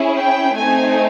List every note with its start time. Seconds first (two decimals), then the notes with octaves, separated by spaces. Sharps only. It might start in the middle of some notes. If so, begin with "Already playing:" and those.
Already playing: C#4 E4 G#4
0.16 G5
0.57 A3 C4 D#4 G#5